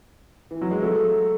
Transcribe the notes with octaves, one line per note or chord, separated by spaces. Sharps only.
E3
F#3
G#3
F#3 A3